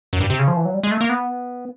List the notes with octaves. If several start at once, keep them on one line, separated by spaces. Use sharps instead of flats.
F#2
G2
C3
C#3
F3
E3
F#3
G3
G#3
A3
A#3
B3